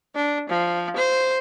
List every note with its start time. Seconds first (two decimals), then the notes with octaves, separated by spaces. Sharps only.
0.15 D4
0.49 F3
0.96 C5